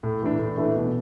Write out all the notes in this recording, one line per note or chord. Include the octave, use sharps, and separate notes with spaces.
A2
E3 A3 D4
A2
E3 A3 D4
B2